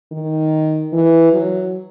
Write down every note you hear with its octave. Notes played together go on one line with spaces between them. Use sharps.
D#3
E3
F#3